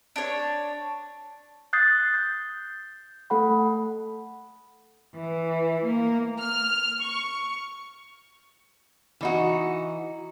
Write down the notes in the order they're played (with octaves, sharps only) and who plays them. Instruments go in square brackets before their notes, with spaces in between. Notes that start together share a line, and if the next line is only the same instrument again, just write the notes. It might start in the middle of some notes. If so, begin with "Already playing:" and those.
[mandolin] D4 C#5
[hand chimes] D#6 F#6 G6 A6 C7
G6
A3 A4 F#5 B5
[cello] E3
A#3
[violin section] F6
C#6
[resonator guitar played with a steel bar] E3 D#4 F#4